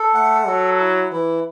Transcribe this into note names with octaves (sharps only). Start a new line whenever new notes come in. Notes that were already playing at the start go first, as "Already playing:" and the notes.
Already playing: A4
A3 F#5
F#3 A4
E4
E3 E4